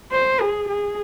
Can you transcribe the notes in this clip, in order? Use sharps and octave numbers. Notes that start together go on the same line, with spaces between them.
C5
G#4
G#4